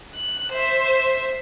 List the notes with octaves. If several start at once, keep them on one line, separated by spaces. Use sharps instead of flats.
F#6
C5 E5